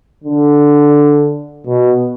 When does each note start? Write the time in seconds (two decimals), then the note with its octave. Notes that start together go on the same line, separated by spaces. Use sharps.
0.24 D3
1.67 B2